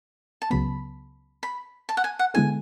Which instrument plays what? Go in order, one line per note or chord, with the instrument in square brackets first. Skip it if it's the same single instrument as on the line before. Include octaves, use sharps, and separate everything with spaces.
[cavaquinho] A5
[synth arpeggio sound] C#2 C#3 F#3 B3 [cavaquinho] B5
[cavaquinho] B5
A5
F#5
G#5
F#5
[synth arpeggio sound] D3 G#3 B3 E4 A4 [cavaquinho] G#5